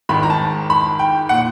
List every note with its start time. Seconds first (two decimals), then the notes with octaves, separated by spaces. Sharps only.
0.09 G#1 G#2 D#3 B5
0.23 A#5
0.30 A5
0.70 B5
0.99 G5
1.29 A#2 F#5